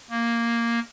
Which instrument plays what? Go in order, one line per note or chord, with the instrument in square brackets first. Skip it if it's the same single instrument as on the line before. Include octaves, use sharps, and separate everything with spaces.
[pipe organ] A#3